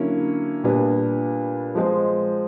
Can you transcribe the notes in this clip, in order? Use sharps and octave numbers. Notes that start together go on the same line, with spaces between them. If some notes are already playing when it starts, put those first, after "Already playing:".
Already playing: D3 F#3 A#3 C#4 E4
A#2 G3 B3 D4
F3 G#3 C4